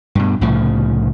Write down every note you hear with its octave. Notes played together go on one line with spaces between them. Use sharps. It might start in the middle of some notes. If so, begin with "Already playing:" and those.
G2 B2
C2 A2 C#3 F3